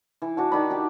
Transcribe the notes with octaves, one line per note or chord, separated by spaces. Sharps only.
E3
D4 F#4 A5
D#3 D5 B5
D4 G4